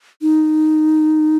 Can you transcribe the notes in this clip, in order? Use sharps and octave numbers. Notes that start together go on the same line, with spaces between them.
D#4